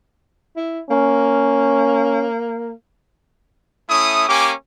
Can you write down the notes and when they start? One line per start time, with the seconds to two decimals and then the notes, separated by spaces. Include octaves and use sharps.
0.57 E4
0.90 A#3 C#4
3.90 A3 C#4 E4 D#6
4.29 A#3 C#4 G4 G#5 D6